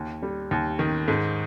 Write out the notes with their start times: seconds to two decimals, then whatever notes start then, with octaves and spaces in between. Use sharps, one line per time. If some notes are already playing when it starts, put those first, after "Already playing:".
Already playing: D#2
0.23 G3
0.51 D#2
0.79 D#3
1.08 G#2